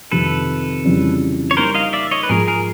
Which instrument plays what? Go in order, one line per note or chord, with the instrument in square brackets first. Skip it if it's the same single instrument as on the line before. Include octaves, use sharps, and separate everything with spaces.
[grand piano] F2 C3 D#3 [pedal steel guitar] A4 B4
[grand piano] F2 C#3 E3 G3
[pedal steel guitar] C#5
[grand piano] G3 A#3 D#4 [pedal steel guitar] A#4 C5
[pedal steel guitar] D#5 F5
D5 E5
C#5 D#5
B4
[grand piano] G#2 F3 G#3 [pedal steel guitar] G#4 A#4
[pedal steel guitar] G#4 A#4